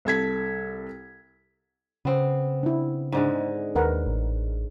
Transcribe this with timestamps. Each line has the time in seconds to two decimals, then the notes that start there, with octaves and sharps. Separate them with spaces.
0.05 C2 A4 G#6 B6
2.05 C#3 B3 C4
2.63 D4 E4
3.12 G#2 D3 G#3
3.75 D#2 A#4 B4 F#5
4.06 A1